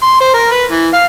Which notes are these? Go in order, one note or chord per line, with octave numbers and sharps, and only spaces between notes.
C6
C5
A#4
B4
E3
F5